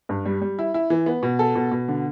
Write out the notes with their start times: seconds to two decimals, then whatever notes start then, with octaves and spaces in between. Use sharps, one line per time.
0.09 G2
0.25 G3
0.42 G3
0.59 E4
0.74 E4
0.90 E3
1.06 B3
1.23 B2
1.39 A4
1.56 B2
1.72 B2
1.88 D3